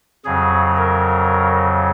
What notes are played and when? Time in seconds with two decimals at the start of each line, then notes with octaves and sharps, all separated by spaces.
0.25 F2 C#3 F#3 G#4
0.76 A#4